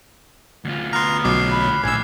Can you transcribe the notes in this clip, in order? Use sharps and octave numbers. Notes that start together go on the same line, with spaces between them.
D2 F4
B3 A#5 C6 F6 F#6
B1 B2 F#3 D6 C7
B5
A#1 A2 F3 G#5 E6